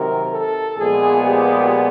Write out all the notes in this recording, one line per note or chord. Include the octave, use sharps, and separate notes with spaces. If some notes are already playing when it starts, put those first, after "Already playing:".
Already playing: C3 D#3 F#3 A#4
A4
A#2 F3 G#3 B3 G#4
G4